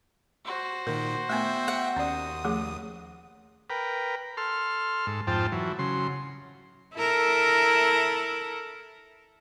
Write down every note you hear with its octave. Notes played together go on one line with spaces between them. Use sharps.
F#4 C5
A#2 D#3 A#4
A3 B3 E5 G5
F#5
D#2 C#4 D5 D#6
F3 A3 G#4
A#4 B4 G5
A4 C6 F6
G#2 A4
F2 G#2 F4 C5 G5 A5
E3 F#3
C#3 F#3 C6
E4 A4 A#4